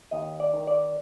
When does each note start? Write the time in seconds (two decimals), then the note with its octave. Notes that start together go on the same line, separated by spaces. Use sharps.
0.11 D#2 D#5
0.40 D5
0.53 D#3
0.67 D5